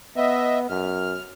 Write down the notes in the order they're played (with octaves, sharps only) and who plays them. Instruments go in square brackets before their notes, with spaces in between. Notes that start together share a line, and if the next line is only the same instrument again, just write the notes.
[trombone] B3 [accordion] D#5 E5
[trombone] F#2 [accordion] F6